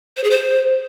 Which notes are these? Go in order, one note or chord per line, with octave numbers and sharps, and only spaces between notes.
C5
G#4
C5